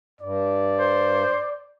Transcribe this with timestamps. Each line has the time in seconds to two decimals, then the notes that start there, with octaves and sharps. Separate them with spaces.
0.21 G2 D5
0.79 C5